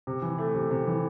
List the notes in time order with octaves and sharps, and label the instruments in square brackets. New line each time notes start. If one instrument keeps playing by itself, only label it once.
[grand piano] C3
E3
A3
C3
C3
E3